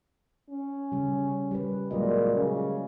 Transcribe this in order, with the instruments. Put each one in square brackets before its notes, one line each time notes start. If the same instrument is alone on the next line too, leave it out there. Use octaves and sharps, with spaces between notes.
[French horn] C#4
[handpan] C#3 G3
G3 G4 B4
[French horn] A#2 [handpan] F#3 G#3 D#5
[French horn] C#3